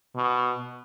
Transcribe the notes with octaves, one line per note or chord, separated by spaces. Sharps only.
B2